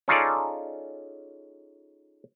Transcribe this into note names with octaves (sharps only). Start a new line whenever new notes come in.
C#4 D#4 F4 G#4 A4 D5